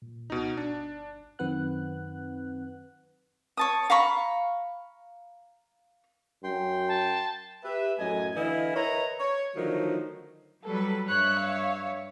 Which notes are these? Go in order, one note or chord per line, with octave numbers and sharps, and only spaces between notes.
A#2
C#2 B2 D#4
G1 D4
F#2 D#3 C4 B4 F#5 F#6
C#5 A5 D#6
F5 A#5 B5 C#6
F#2 G5 C6
A5
G4 B4 E5
F#2 A2 A3 D#5 G#5
D3 E3 E4 D#5 F5 G#5
A#4 B4 C#5 D#5 E5 A#5
C#5
D3 D#3 F3 F#3 A3 D#4
F#3 G3 A4 B4
G2 C#5 E5 F#6
F5